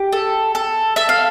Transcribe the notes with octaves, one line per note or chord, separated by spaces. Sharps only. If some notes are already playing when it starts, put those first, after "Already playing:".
Already playing: G4
A4
A4
A4 E5
F5